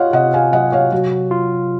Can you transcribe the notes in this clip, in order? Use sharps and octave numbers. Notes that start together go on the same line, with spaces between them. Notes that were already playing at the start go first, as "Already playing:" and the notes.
Already playing: F4 C#5 D#5 F5 F#5
C3 D#5 F#5
F5 G#5
F#3 D#5 F#5
C#5 F5
F#3 F#4
F4